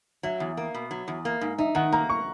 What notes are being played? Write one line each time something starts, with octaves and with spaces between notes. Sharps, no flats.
F#3 E5
E2
A#3
B2
F#3
E2
A#3
G#2
D#4 E5
D#3 F#5
A#3 A#5
C#6